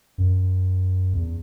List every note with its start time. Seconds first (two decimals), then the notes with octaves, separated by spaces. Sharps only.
0.18 F#2
1.14 E2